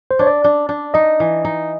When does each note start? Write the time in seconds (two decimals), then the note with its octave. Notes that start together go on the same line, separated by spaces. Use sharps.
0.11 C5
0.19 D4 C#5
0.27 D5
0.44 D4
0.69 D4
0.94 D#4 D#5
1.20 E3
1.45 D#4